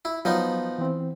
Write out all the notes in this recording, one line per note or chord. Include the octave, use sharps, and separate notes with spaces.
E4
F3 F#3 B3 D#4
E3 C4